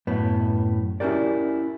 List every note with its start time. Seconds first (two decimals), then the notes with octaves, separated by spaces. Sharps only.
0.07 F#2 A2 B3
1.00 C#4 E4 F#4 G4 A#4 D5